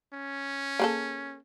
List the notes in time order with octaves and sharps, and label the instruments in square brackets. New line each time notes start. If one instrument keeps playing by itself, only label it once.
[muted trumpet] C#4
[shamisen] A#3 G#4 A4